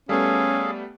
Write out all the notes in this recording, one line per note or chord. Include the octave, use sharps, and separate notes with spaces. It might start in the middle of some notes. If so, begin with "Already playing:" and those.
G3 A3 B3 C#4 G#4 A4 F5